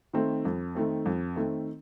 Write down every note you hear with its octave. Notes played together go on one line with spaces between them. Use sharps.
D#3 A3 C4
F2
D#3 A3 C4
F2
D#3 A3 C4